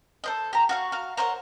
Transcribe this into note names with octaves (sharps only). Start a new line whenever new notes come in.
A4 C5 D#5
G4 A#5
F#4 F5 C#6
F#4 F5
A#4 C5 C#5 F#5